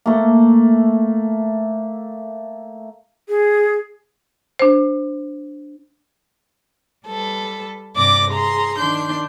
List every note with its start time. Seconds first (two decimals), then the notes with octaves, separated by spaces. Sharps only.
0.06 A3 A#3
3.29 G#4
4.59 D4 C5
7.05 G3 A4 B4
7.94 G2 C3 D5 D6 A#6
8.30 G#4 A#5 C6
8.78 D#3 D4 C6 G6